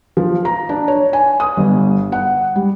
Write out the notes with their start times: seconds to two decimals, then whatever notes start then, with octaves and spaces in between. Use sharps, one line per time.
0.17 F3
0.45 A#5
0.69 D4
0.88 C#5
1.13 G#5
1.40 D#6
1.57 G1
2.12 F#5
2.55 G3